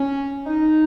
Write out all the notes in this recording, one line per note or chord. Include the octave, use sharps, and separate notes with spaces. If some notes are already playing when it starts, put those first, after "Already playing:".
Already playing: C#4
D#4